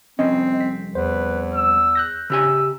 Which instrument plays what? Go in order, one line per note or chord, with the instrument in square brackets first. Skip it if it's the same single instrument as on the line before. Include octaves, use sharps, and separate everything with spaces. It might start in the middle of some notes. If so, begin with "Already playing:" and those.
[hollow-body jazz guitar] C2 F2 C#4 [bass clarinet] C4 [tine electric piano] D#5
[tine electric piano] B6
[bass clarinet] E2 [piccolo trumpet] B4 [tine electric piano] C5
[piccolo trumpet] E6
[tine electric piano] F#6 G6 A#6
[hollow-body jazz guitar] C#3 G4 G#5 [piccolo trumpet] E6